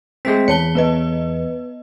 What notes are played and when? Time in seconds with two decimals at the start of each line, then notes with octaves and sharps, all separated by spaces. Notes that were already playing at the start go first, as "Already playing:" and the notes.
0.25 G#3 A3 C4 B6
0.48 E2 C#5 A5 C#7 G7
0.75 B3 B4 D#5